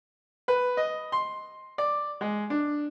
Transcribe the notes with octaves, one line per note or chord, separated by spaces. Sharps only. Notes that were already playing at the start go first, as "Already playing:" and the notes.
B4
D#5
C6
D5
G#3
D4